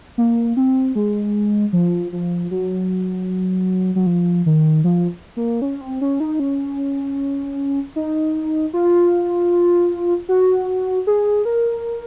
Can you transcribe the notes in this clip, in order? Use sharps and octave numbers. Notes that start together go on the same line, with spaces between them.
A#3
C4
G#3
F3
F3
F#3
F#3
F3
D#3
F3
A#3
C#4
C4
C#4
D#4
C#4
D#4
F4
F#4
G#4
A#4